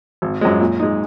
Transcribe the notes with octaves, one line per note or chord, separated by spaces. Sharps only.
G#1
F#2 F3 G#3
A#2
G#3 D#4